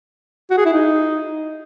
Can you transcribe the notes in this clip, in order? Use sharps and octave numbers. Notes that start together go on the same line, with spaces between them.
F#4
G#4
E4
D#4